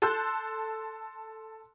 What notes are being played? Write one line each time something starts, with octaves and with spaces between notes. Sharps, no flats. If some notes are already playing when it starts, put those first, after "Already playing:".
A4 A5 C6 E6 F#6 G6